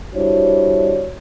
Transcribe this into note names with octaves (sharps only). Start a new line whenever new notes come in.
G3 D4 E4 F#4 C5 C#5